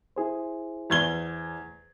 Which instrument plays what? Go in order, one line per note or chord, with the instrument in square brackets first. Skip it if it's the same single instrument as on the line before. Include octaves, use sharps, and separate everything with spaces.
[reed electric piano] E4 G#4 C5
[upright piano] E2 G#6 G7